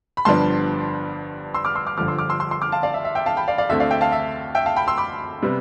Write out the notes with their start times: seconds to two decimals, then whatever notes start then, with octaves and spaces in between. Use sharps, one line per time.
0.17 B5
0.25 G1 G2 F3 B3 D4 A5 C6
1.54 C6 E6
1.65 D6 F6
1.75 C6 E6
1.87 D6 F6
1.97 G1 G2 D3 F3 D6 F6
2.08 C6 E6
2.19 D6 F6
2.29 C6 E6
2.40 C6 E6
2.51 C6 E6
2.62 D6 F6
2.72 F5 A5
2.83 D5 F5
2.94 E5
3.05 E5
3.15 E5 G5
3.26 F5 A5
3.37 G5 B5
3.48 D5 F5
3.58 D5 F5
3.69 D2 D3 A3 C4 E5
3.80 D5 F5
3.91 E5 G5
4.01 F5 A5
4.12 E5
4.55 E5 G5
4.66 F5 A5
4.76 G5 B5
4.87 C6 E6
4.98 B5 D6
5.42 C3 G3 B3